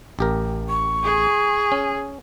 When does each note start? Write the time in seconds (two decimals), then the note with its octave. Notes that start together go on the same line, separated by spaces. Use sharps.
0.19 A1 G4 A#4
0.69 C#6
1.04 G#4
1.72 C#4